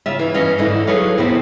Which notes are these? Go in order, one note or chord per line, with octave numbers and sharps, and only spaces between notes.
C#3 F4 E5
E3 F4
G2 E3 C#4 D#5 F5
G#2 D3 D#4 E4
F#3 G#4 A4 B4 C#5 F5
D#2 B2 A3 C4 E4